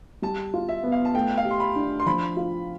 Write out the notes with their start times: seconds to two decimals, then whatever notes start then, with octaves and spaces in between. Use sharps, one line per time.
0.22 G3 A5
0.54 F4
0.69 E5
0.83 B3
0.92 F5
1.05 A5
1.15 A3 G5
1.37 F5
1.45 G4
1.51 C6
1.60 B5
1.76 D4
2.00 C6
2.06 F3 B5
2.37 F4